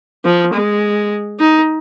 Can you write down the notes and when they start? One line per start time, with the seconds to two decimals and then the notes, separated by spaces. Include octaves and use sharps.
0.25 F3
0.53 G#3
1.40 D#4